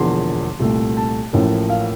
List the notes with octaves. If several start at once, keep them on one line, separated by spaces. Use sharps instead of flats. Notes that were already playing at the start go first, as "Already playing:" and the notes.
Already playing: E1 E2 D3 F3 A#3 C6
C2 A#2 A3
A5
A1 A2 F3 A#3
F5